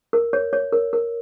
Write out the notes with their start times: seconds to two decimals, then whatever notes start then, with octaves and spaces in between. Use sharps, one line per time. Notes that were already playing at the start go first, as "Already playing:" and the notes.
0.13 A#4
0.33 C#5
0.53 C#5
0.72 A#4
0.93 A#4